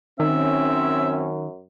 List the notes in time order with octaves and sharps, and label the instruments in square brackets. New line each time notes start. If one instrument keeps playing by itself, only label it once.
[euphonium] F#2 [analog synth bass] D#3 [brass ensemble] C4 C#4 [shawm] E5